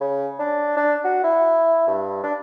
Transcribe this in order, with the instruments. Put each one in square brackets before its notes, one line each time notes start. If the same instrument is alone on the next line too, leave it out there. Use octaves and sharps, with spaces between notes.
[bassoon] C#3
D4
D4
F#4
E4
G2
D4